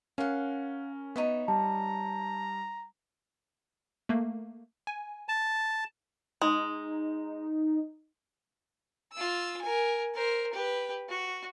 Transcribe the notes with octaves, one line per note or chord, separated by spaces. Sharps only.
C#4 A#4 F5 F#5
B3 D#4 C#5 E5
G3 A5 A#5
A3 A#3
G#5
A5
G#3 D#4
F4 E6
A#4 G#5
A#4 C5
G4 B4
F#4